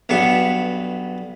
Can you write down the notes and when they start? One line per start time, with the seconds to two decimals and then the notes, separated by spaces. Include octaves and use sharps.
0.09 B1 G2 B3 C#6